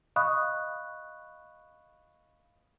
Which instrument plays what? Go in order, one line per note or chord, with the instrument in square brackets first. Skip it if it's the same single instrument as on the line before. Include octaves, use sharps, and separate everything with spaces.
[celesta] D#5 F5 B5 C#6 D#6 F#6